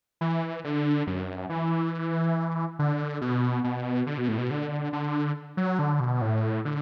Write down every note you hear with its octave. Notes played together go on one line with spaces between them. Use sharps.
E3
D3
F#2
E3
D3
B2
B2
D3
B2
A2
B2
D3
D3
F#3
D3
B2
A2
D3